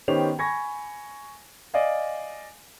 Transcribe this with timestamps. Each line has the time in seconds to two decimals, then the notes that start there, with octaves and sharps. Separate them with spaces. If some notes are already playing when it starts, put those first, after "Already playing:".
0.08 D#3 B3 C#4 G4 C5 F7
0.39 G#5 B5 C#6 G#6 A#6
1.74 D5 D#5 F5 G#5